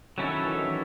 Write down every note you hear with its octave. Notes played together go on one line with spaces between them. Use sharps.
D#3 F#3 C#4 E4 A4 C#5
E3
D#3
E3